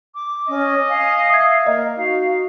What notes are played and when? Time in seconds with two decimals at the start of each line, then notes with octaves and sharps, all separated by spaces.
0.15 D6
0.48 C#4 D#5
0.89 F5 G#5
1.30 E5 D#6 G#6
1.67 A#3 A#4 D#5
1.97 D#4 F#4 F5